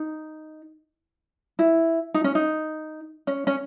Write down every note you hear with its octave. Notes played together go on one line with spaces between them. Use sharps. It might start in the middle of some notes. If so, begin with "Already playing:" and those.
Already playing: D#4
E4
D#4
C#4
D#4
C#4
C#4